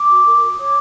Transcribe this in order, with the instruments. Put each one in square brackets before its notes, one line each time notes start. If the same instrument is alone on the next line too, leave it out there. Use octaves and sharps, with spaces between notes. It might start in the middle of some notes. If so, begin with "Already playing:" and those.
Already playing: [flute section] D6
F#4
A#4
F#4
D#6
C#5 D6